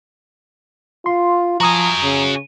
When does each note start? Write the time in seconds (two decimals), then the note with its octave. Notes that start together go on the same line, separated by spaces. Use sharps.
1.06 F4 C6
1.61 F3 F#4 G#5 A#5 D#6
2.03 C#3